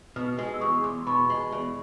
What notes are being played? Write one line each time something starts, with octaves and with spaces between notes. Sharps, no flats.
B2 D#6 F6
G#3
E6
E2 C#6 D#6
E2 C6 D6
C6
B2 B5 C#6
G#3
E2